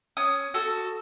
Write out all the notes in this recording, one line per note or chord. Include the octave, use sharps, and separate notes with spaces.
C#4 D#6
F#4 A4